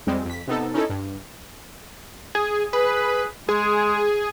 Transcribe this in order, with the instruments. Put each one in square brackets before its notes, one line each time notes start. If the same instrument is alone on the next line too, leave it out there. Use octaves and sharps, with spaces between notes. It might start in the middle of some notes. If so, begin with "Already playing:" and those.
[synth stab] F2 G3 G#3 C4
F2 B6
C3 B3 D#4 A4
C#4 D#4 E4 A4
G2
[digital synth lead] G#4
[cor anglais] G#4 [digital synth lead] B4
[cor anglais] G#3 [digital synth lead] G#4